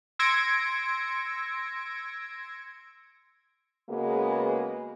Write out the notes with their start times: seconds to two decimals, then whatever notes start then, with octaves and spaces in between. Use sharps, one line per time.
0.19 C6 E6 G#6 A#6 C#7 D7
3.90 C#3 G#3 A#3 B3 F#4